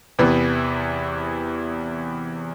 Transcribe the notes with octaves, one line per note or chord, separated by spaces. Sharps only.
E2 C3 E3 B3